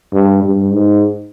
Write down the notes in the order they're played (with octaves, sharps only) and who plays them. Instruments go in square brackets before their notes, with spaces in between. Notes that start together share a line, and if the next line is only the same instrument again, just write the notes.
[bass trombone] G2
G2
G#2